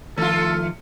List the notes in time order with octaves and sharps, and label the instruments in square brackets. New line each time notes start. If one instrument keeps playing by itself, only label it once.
[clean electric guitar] D#3 F3 [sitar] A3 F4 [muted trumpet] A4